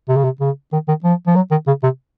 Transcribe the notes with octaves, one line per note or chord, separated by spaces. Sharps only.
C3
C#3
C3
C#3
D#3
D#3
F3
F3
F#3
D#3
C#3
C3